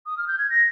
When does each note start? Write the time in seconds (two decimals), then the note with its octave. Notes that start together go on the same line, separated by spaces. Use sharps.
0.06 D#6
0.18 F6
0.27 G6
0.38 G#6
0.50 A#6